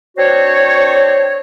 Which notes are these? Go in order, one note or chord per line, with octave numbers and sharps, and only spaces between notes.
C4 D4 F#4 C5 C#5